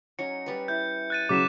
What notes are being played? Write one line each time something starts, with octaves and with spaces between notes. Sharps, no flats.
F#3 C#4 D#4 C#7
G3 B4
E4 G6
F#6 A6 D#7
C#3 F#3 D6 B6 E7